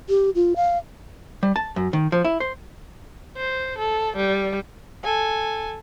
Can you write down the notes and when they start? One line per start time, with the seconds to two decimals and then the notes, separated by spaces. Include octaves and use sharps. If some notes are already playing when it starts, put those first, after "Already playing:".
0.09 G4
0.35 F4
0.56 F5
1.43 G3
1.56 A5
1.76 F#2
1.93 D#3
2.12 F3
2.25 E4
2.40 C5
3.37 C5
3.78 A4
4.17 G3
5.04 A4 G#5